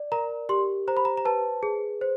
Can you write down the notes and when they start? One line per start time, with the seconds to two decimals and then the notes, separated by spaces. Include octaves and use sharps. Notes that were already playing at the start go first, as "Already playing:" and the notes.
Already playing: D5
0.12 A#4 A#5
0.49 G4 C6
0.88 C5 A#5
0.97 B5
1.05 A#5
1.17 A#5
1.25 B4 A5
1.63 G#4
2.01 C5